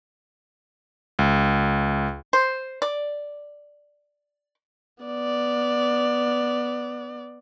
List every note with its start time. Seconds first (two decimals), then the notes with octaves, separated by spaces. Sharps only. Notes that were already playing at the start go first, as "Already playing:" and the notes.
1.19 C#2
2.33 C5
2.82 D5
5.04 B3 D5